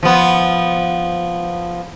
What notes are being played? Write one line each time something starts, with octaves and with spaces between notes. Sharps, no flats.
F3 B3